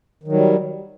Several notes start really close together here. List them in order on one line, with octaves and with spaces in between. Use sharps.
D#3 F#3 G3